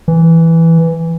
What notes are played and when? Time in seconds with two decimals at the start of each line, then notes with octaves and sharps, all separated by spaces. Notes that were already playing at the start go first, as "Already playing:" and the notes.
0.08 E3